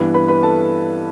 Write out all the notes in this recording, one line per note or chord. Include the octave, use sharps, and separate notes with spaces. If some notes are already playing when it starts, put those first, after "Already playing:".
Already playing: G2 E3 B3
B4 B5
B4 B5
A4 A5